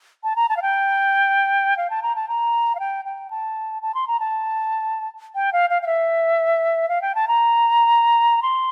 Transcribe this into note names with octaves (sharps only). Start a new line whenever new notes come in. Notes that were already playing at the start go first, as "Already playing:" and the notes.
A5
A#5
A5
F5
G5
F5
A5
A#5
A5
A#5
F5
G5
G5
A5
A5
C6
A#5
A5
G5
F5
F5
F5
E5
F5
G5
A5
A#5
C6